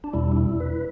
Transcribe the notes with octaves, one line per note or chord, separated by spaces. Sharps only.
D4
E2 B2 G3 E4
D4
E4
B4